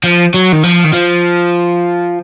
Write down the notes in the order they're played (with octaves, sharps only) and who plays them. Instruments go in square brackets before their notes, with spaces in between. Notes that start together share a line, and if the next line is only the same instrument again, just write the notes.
[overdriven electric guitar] F3
F#3
D#3
F3
D#3
F3